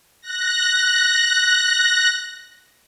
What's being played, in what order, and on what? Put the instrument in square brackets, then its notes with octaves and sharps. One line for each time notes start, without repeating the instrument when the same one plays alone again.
[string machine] F#6 A#6